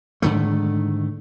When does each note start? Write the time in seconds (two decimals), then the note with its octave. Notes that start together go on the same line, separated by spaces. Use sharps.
0.22 G#2 D3 D#3 A3